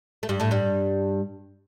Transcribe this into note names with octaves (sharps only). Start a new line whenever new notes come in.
A3
G2 G3
A2 A3
G2 G3